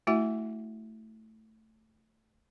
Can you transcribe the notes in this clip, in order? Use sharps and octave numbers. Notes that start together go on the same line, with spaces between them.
A3 E4 F#4 E5 F#5